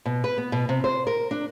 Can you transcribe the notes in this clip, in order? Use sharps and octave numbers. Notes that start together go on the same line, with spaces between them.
B2
B4
B3
B2
C3
C5
A#4
D4